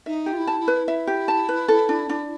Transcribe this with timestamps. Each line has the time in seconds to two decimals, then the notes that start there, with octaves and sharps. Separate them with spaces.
0.06 D#4 E5
0.26 G4
0.33 F4
0.37 E4
0.47 A5
0.60 E4
0.68 B4
0.88 E4 E5
1.07 G4
1.28 A5
1.49 B4
1.68 A4
1.89 D4
2.09 D4